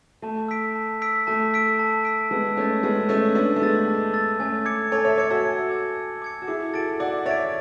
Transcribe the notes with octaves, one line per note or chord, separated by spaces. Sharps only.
A3 A5
E6 B6 D7
A5
E6 B6 D7
A3 A5
E6 B6 D7
A5
E6 B6 D7
G#3 B3 A5
A3 C#4 E6 A6
G#3 B3 A5
A3 C#4 E6 A6
B3 D4 A5
A3
G#3 B3 E6 A6
A5
E6 A6
A3 C#4 G#5
D6 G#6 C#7
A4 C#5 G#5
C#5 E5
C#5 E5 D6 G#6 C#7
F#4 A4
G#5
D6 G#6 C#7
G#5
D6 G#6 C#7
F#4
E4 G#4 D6
F#4 A4 A6 D7
D5 F#5 D6
C#5 E5 A6 D7